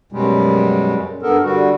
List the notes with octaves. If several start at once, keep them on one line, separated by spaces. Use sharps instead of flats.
F#2 B2 G3 G#3
G2 B3 A4 A#4
D3 G3 F#4